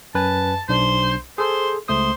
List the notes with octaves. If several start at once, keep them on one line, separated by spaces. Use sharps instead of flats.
F#2 B4 G#5 A5
B1 D4 C5
G#4 A4 C5 C6
C#2 A3 C5 D#6